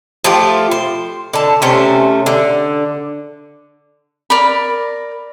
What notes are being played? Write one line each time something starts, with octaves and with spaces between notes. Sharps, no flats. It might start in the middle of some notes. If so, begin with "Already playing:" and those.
F3 A3 F4 G4
C5
D3 A5
C3 A3 C#4 C5
D3
A#4 D5 B5